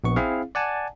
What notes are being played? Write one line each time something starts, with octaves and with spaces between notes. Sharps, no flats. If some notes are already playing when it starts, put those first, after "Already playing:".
A#1 B3 C#6
C4 E4 G#4 F5
D5 F#5 G#5 A5